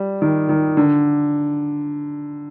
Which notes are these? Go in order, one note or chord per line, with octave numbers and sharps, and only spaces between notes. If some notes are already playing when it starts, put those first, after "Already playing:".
Already playing: G3
D#3
D#3
D3